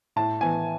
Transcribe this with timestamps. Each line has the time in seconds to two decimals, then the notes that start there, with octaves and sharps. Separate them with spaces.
0.16 A2 A5
0.41 E3 B3 G#5